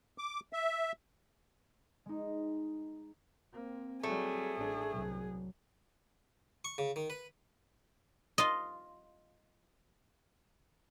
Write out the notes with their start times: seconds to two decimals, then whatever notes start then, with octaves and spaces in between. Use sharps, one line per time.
0.18 D6
0.53 E5
2.06 G#3 D#4
3.54 A#3 C4
4.04 F#3 G3 A3 G#4
4.57 A1 D4
4.91 C2 F#3
6.65 C#6
6.78 C#3
6.96 D#3
7.10 B4
8.38 F4 D#5